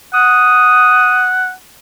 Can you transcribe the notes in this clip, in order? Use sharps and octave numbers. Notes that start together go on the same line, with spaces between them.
F#5 D#6